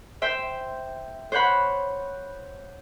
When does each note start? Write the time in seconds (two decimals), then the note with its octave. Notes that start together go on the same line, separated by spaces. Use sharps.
0.22 C5 E5 G5
1.32 C5 C#5 F#5 B5